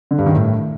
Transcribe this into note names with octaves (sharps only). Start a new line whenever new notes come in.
D3
G2
D#3
A2